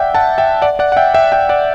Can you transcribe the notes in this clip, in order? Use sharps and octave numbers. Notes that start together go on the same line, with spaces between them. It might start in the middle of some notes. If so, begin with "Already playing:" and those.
Already playing: D5 E5 F#5 G5
F#5 A5
E5 G5
D5 F#5
D5 F#5
F#5
E5 G5
E5 G5
E5 G5
D5 F#5